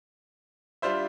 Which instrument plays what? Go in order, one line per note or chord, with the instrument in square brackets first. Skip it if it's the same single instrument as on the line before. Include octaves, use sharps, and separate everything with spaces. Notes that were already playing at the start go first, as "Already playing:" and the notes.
[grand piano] G3 D4 F4 C5 E5